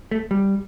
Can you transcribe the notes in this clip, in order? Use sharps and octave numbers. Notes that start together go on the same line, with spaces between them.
A3
G3